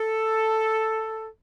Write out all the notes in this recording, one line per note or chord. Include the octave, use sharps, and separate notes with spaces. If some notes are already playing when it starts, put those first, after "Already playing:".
Already playing: A4